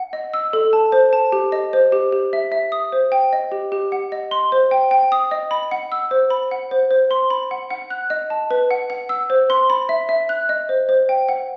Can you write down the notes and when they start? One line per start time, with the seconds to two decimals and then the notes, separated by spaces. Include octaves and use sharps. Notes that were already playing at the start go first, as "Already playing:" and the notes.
Already playing: F#5
0.13 D#5
0.34 E6
0.53 A4
0.73 A5
0.92 C5
1.13 A5
1.32 G4
1.52 D#5
1.73 C5
1.92 G4
2.12 G4
2.33 E5
2.52 E5
2.72 D#6
2.92 C5
3.12 G5
3.33 D#5
3.52 G4
3.72 G4
3.92 F#5
4.12 D#5
4.31 C6
4.52 C5
4.71 G5
4.91 G5
5.12 D#6
5.31 D#5
5.51 B5
5.71 F#5
5.92 E6
6.11 C5
6.30 B5
6.51 F#5
6.71 C5
6.91 C5
7.11 C6
7.30 B5
7.51 F#5
7.70 F#5
7.90 F#6
8.10 D#5
8.30 A5
8.51 B4
8.71 F#5
8.90 F#5
9.09 E6
9.30 C5
9.50 C6
9.70 B5
9.89 E5
10.09 E5
10.29 F#6
10.49 D#5
10.69 C5
10.89 C5
11.09 G5
11.29 F#5